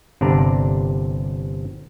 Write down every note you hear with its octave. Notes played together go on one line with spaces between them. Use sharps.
G1 C3 D4 D5 A#5